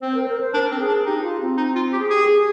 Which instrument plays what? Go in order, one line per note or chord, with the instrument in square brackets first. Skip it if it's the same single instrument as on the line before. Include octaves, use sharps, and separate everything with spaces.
[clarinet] C4 [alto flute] C5
[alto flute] A#4
C5
A#4
C5
[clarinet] D4 [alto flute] A#4
[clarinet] C4
[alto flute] G#4
[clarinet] D4
[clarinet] D#4 [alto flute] G4
[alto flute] G4
F4
C4
[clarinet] D#4
F4
G4
[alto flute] G#4
[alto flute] G4 [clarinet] G#4
[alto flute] A#4
G#4